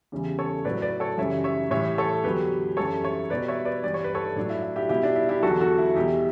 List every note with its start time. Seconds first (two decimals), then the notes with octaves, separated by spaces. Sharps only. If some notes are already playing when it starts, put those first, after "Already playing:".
0.12 E2 C#3 E3 G3
0.39 A4 C#5
0.65 A2 F#3 B4 D5
0.82 B4 D5
1.00 A4 C#5
1.18 F#2 C#3 E3 G3 C#5 E5
1.44 C#5 E5
1.71 A2 E3 G3 C#5 E5
1.98 A4 C#5
2.24 E2 D3 F#3 G4 B4
2.77 F#2 E3 G3 A4 C#5
3.03 C#5 E5
3.30 B2 G3 B4 D5
3.48 C#5 E5
3.65 B4 D5
3.84 G2 E3 G3 D5
3.94 C#5
4.04 B4
4.15 A4 C#5
4.36 A2 F#3 D4
4.50 E4
4.63 E4
4.76 E4 G4
4.89 B2 G3 E4 G4
5.03 D4
5.16 E4
5.29 E4 G4
5.43 E2 D3 F#3 F#4 A4
5.60 F#4 A4
5.78 E4
5.95 E2 B2 G3 E4 G4